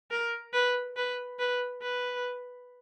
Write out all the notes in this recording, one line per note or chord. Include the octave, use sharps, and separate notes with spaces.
A#4
B4
B4
B4
B4